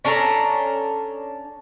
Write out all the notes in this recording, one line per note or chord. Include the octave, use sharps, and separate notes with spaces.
C#4 D4 A4 A#5